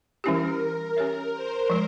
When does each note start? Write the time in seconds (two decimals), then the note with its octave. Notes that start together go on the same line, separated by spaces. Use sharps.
0.24 E3 G3 C#4 E4 G4 A#4
0.96 C#4 G4 A#4 C#5 E5
1.33 C5
1.70 F3 G#3